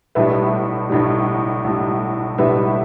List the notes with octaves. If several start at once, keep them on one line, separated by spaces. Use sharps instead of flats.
B1 A2 G3 B4 E5
B1 A2 G3
B1 A2 G3
B1 A2 G3 B4 E5